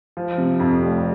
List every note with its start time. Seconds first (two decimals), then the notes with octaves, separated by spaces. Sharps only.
0.17 F3
0.38 C3
0.60 F2
0.82 F1